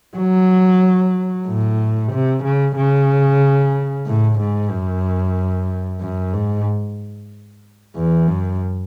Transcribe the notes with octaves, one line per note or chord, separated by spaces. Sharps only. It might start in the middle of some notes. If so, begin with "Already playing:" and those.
F#3
A2
C3
C#3
C#3
A2
G#2
F#2
F#2
G#2
E2
F#2